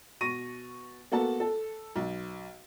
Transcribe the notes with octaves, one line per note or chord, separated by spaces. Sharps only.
B2 C#6 A#6 D#7
A#3 B3 F#4 A4 A5
A4
B1